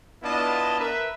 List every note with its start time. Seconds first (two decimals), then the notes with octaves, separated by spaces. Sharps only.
0.23 B3 D4 E4 F4 D#5 A5
0.79 A#4 B4 E5